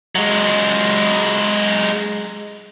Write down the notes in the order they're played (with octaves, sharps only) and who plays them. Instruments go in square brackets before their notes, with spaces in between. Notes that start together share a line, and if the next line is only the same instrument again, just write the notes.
[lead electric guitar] F#3 G#3